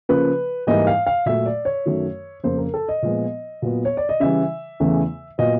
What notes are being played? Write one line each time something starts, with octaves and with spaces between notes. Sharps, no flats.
C#3 F3 A#3 B4
G#2 E3 G3 A#3 D#5
F5
F5
A#2 F#3 A3 E5
D5
C#5
F#2 D#3 F#3 A3
F2 C#3 F3 A#3 C5
A#4
A4
D#5
A#2 F3 G#3 B3
A#2 F#3 B3
C#5
D5
D#5
C#3 E3 G3 E5
E2 C#3 E3 A3
A#2 F#3 B3 D#5